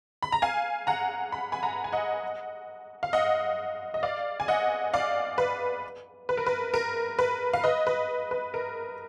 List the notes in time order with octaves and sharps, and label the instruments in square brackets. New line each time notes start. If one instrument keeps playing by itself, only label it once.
[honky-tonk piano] B5
A#5
F5 G#5
F#5 A#5
B5
G#5 B5
F#5 A#5
G#5
D#5 F#5
F5
D#5 F#5
D#5
D5 F5
G#5
D#5 F#5
D5 F5
B4
B4
A#4
B4
A#4
B4
F5
B4 D#5
B4
B4
A#4